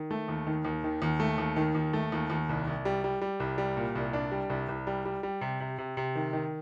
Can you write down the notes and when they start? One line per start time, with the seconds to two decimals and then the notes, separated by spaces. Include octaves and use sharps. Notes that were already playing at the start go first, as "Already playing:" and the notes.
Already playing: D#3
0.11 A3
0.28 D#2
0.47 D#3
0.65 D#2
0.84 D#3
1.02 D#2
1.20 A3
1.38 D#2
1.56 D#3
1.75 D#2
1.93 A3
2.12 D#2
2.30 D#2
2.49 C2
2.67 C2
2.85 G3
3.04 G3
3.21 G3
3.40 C2
3.58 G3
3.77 A#2
3.95 C2
4.13 D4
4.32 G3
4.50 C2
4.68 C2
4.87 G3
5.05 G3
5.23 G3
5.41 C3
5.60 C3
5.78 C3
5.97 C3
6.15 D#3
6.33 D#3